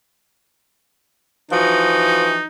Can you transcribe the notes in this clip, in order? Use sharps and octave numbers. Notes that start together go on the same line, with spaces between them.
E3 F3 D#4 F#4